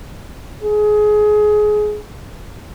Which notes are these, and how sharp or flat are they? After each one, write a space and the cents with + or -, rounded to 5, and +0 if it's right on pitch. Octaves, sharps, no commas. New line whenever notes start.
G#4 +20